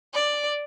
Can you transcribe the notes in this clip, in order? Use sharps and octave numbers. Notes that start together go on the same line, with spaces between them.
D5